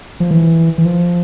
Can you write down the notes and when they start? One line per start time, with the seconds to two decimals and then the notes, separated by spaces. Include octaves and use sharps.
0.20 F3
0.31 E3
0.78 E3
0.86 F3